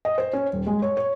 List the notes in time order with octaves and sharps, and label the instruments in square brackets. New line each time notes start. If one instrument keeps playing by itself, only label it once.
[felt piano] D#5
C5
C#4
D#1
G#3
C#5
C#5